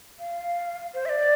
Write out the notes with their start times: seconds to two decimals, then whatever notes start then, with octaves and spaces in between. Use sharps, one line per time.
0.19 F5
0.94 C5
1.06 E5
1.09 D5